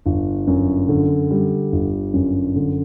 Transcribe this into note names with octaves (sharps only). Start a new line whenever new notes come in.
G1
F#2
D3
G3
G1
F#2
D3